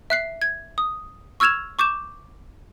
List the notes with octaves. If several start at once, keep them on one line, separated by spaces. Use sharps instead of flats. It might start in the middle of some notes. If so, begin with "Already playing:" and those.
E5 F#6 C7
G#6
D#6
C#6 E6 F6 G#6 E7 F7
C#6 D6 G6 E7